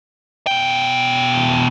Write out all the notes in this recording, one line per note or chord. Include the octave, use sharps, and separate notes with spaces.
B2 G5